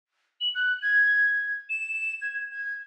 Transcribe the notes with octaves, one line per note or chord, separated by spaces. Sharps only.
F#7
F#6
G#6
E7
G#6
G#6